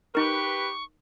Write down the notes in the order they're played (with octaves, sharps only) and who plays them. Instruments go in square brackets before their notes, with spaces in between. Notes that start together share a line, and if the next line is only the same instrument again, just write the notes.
[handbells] D#4 A#4 [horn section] G4 B4 [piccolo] C#6